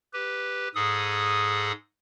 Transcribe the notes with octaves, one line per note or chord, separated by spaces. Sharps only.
G4 B4
G#2 G#4 A4 D#6